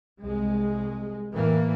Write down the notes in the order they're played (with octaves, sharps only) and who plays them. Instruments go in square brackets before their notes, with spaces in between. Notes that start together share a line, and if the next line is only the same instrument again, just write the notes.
[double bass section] C2 G#3
A2 E3 A#3